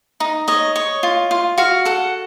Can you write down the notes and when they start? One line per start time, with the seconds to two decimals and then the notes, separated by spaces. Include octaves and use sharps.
0.20 D#4
0.48 C#5 D#5
0.76 C#5
1.03 F4
1.31 F4
1.58 F#4 F5
1.85 A4 F#5